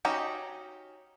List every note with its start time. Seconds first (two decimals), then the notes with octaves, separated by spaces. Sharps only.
0.05 C#4 D#4 F#4 G4